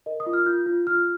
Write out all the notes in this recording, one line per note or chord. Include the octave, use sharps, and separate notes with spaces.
A#4 D#5
D#6
F4
F6
F4 G6
F4
F4 F6